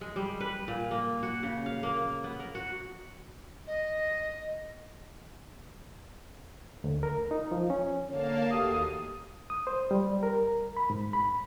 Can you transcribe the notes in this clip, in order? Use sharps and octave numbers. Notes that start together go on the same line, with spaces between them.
G#3
G3
B4
A#2
A#3
F#4
C#3
F5
A#3
B3
A#4
F#4
D#5
D2
A#4
D#4
F3
C#4
D3 A#3 C#5 F5 A5
D#2 A3 F#4 G4 D#6
D#6
C5
G3
A#4
B5
G#2
B5